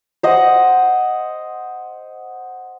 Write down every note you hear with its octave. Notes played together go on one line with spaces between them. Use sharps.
C5 D#5 F#5